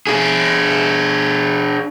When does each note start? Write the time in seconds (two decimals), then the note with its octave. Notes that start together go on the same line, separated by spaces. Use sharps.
0.07 D4 G#4